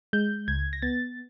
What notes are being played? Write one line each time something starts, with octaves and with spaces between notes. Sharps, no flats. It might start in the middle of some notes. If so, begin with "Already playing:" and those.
G#3 G6
C#2 G#6
A#6
B3 A6